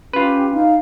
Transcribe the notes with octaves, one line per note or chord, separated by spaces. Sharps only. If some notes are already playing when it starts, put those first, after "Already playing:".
C#4 F4 G4 B4
D#4 F5